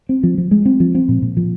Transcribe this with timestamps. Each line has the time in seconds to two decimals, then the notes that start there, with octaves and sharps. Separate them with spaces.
0.09 C4
0.23 F3
0.38 F3
0.51 G#3
0.66 C4
0.80 F3
0.95 C4
1.09 A#2
1.22 A#2
1.37 F3